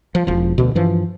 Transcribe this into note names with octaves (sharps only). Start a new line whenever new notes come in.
F3
E1 F3
D2 B2
G2 E3 F3